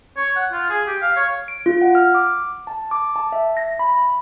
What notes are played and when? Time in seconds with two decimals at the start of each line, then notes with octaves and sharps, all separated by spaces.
0.17 C#5
0.36 F#5
0.52 F4
0.70 G#4
0.87 G4
1.02 F5
1.17 C#5
1.48 D7
1.66 F4
1.82 F#5
1.95 F6
2.15 D6
2.67 A5
2.91 D6
3.16 A5
3.32 E5
3.57 A#6
3.79 B5